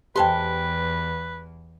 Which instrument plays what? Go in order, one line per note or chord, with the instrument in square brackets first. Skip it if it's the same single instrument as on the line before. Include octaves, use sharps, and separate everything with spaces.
[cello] E2 [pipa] G#3 A4 C6 [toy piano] G4 C5 G5 [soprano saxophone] B4